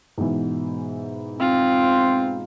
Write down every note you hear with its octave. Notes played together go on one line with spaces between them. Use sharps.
G#2 B2 E3
C4 F4